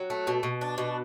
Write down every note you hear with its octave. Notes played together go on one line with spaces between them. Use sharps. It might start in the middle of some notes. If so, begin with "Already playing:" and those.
Already playing: F#3
A3
B2
B2
D4
B2